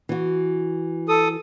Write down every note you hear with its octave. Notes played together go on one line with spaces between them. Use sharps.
E3 F#4
A4 D#6